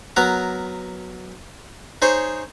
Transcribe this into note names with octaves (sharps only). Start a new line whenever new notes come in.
F#3 B3 A#4 A#5
D#4 G#4 C5 C#5